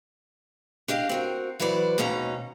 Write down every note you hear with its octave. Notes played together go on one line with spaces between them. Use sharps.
D4 G4 D#5 F5
C4 F#4 A#4
E3 F#3 B4 C5 D5
D#2 G#2 B2 C#4 D#4 A#5